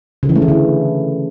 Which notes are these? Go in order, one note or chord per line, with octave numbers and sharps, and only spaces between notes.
C#3
E3
A3
E3
D3